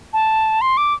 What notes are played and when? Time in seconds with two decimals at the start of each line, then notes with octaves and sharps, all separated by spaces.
0.13 A5
0.61 C6
0.77 D6